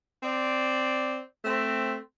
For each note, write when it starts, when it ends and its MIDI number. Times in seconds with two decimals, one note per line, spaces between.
0.23 1.20 60
0.23 1.20 74
1.45 1.96 57
1.45 1.96 60